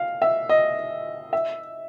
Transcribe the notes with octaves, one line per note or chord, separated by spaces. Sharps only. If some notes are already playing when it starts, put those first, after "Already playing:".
Already playing: F5
E5
D#5
E5